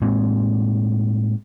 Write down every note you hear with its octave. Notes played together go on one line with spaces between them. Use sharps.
A2 G#3 A#3 C4